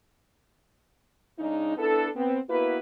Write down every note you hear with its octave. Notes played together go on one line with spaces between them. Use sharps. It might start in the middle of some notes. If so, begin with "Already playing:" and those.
C#3 G#3 D4 D#4
B3 D4 E4 A4
B3 C4
A#3 B3 E4 F#4 B4